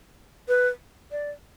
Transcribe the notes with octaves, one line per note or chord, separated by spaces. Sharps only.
B4
D5